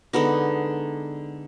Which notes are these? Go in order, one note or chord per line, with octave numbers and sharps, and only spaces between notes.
D3 G#3 B3 D#4